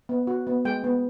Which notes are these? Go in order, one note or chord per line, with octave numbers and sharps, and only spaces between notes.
B3
F#4
B3
G#3 G5
B3